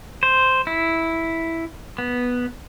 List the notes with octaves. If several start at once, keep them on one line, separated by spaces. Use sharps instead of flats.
C5
E4
B3